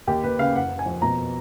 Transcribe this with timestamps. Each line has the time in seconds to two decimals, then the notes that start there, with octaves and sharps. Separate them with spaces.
0.07 D#2 G4
0.24 D#2 B4
0.39 C#3 F5
0.55 F#1 F#5
0.70 F#1
0.79 G#5
0.86 F2
1.02 B2 A#5